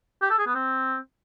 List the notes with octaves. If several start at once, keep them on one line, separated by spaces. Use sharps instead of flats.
G4
A4
G#4
B3
C4